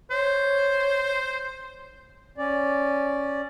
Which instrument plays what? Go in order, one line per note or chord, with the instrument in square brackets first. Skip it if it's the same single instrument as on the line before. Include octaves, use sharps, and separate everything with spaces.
[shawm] C5 [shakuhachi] C#5
[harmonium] C#4 D5